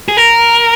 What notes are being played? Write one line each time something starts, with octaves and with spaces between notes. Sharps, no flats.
G#4
A#4